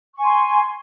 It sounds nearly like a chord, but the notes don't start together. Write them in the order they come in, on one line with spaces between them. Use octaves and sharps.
C#6 G#5 C6